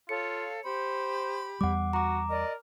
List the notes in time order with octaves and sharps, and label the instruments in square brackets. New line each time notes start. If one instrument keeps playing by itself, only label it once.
[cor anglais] F4 [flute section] A4 C#5 F5 [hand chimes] C#7
[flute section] G4 B5 [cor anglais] C5
[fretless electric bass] E2 G3 [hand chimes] F#5 D6
[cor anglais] F#4 [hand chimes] A#5 D6
[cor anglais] A#4 [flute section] D5 D#5